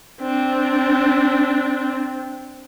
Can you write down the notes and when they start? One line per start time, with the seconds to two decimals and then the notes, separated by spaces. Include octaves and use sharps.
0.22 C4 D4